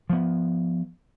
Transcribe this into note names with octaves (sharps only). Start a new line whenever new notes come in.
F3 B3